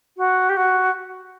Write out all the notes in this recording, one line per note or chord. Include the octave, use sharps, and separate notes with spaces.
F#4
G4
F#4